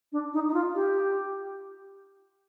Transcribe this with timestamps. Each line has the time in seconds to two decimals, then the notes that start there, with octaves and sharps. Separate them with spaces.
0.12 D4
0.33 D#4
0.48 D#4
0.54 F4
0.75 G4